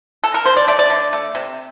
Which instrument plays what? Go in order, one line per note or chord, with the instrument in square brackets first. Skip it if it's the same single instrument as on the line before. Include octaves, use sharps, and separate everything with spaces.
[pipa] A4
A#4
D3 C5
D5
A3 D5
D5
D3
A3
C3